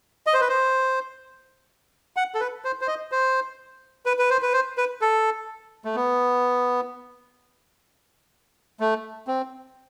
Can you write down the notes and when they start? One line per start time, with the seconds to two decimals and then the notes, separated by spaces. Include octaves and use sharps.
0.27 D#5
0.34 C5
0.41 B4
0.49 C5
2.17 F#5
2.35 A4
2.40 B4
2.65 C5
2.81 C5
2.87 D#5
3.12 C5
4.06 B4
4.19 B4
4.30 C5
4.43 B4
4.53 C5
4.78 B4
5.02 A4
5.85 A3
5.95 B3
8.80 A3
9.28 C4